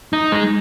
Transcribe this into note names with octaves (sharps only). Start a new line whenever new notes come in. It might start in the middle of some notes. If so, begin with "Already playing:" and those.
D#4
G#3